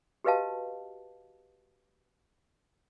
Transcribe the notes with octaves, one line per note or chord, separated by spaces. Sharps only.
F#4 G4 B4 D#5 F5 A5